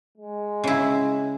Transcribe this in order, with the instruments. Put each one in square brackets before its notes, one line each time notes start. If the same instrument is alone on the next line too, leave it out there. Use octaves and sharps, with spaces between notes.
[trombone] G#3
[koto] C#3 E4